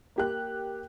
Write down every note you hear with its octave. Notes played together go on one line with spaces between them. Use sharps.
A#3 G4 F#6